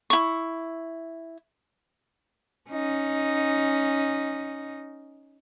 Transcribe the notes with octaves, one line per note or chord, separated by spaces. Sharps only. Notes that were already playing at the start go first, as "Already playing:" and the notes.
E4 C#6
C#4 D#4